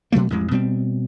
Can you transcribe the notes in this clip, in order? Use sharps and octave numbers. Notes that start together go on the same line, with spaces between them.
B2 F#3 A3 A#3
A1 F2 G#3
B2 G3 B3 C4